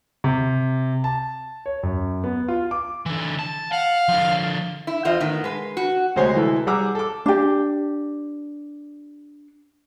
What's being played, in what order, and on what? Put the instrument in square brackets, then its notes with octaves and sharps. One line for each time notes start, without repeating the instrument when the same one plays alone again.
[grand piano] C3
A5
C#5
F#2
B3
F4
D6
[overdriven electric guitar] D3 E3
A5
[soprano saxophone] F5 [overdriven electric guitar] F#5
[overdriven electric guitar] D3 F3
[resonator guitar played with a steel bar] E4
E2 E3 F4 C5 D#5
A2 D#3 B3
G#3 B4
F#4
[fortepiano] D2 C3 G#3 C5 C#5
E3 G#3 E4 A4 B4
G3 G#4 F#5 A#5 D6 E6
A4 D6
[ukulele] D4 G4